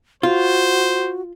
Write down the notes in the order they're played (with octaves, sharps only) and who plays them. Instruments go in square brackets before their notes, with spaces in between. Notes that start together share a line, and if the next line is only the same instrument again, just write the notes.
[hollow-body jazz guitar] F4 [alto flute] F#4 [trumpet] C5